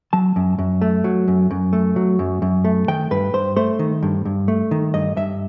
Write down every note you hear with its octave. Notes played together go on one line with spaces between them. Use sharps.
F#3 A5
F#2
F#2
A3
F#3
F#2
F#2
A3
F#3
F#2
F#2
A3
D#3 G5
G2 B4
G2 C5
A3 C5
D#3
G2
G2
A3
D#3
G2 D#5
G2 E5